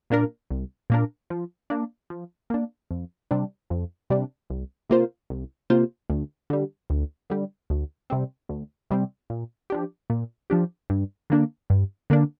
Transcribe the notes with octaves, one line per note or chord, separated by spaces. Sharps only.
A#2 A#3 D4 A#4
C2
A#2 A#3 D4 A#4
F3
A#3 D4
F3
A#3 D4
F2
C3 G3 D4
F2
C3 G3 D4
C2
C3 A#3 F4 C5
C2
C3 A#3 F4 C5
D2
D3 G3
D2
D3 G3
D2
C3 G3 C4
D2
C3 G3 C4
A#2
F3 D4 G4
A#2
F3 D4 G4
G2
D3 A#3 D4
G2
D3 A#3 D4